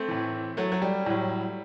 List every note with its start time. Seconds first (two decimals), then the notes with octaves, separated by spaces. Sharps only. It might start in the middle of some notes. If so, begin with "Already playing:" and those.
Already playing: A3 C4
0.08 A2 E3
0.57 F#3 A3
0.72 F#3
0.82 G3
1.06 A2 F#3